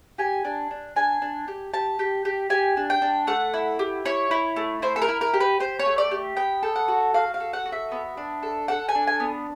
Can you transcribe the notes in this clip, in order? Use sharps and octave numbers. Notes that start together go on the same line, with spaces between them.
G4 G#5
D4
D4
D4 G#5
D4
G4
G4 A5
G4
G4
G4 G#5
D4
G5
D4
A3 F#5
E4
G4
E4 C#5
E4
A3
E4 C5
A4
A#4
E4
A#4
G4
B4
G4 C5
C#5
A3
D5
G4
B3 G5
A4
F#5
F#4
F#4 F5
F5
A4
F#5
F#4
E5
B3
D4
A4
A4 F#5
G#5
D4
G#5
B3